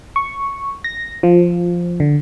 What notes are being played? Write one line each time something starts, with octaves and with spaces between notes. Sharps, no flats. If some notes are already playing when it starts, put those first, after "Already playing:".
C#6
A#6
F3
D3